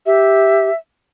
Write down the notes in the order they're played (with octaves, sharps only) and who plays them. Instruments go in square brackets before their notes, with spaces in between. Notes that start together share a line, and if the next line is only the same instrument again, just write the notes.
[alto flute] G4 [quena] E5